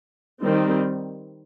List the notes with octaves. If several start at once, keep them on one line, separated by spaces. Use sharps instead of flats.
D#3 G3 C4